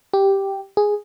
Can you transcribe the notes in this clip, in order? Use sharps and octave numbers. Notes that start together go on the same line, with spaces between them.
G4
G#4